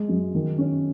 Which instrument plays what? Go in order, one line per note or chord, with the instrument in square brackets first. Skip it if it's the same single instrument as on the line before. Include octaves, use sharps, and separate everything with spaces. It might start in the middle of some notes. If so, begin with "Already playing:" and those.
Already playing: [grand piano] G#3
F#2
D#3
C#4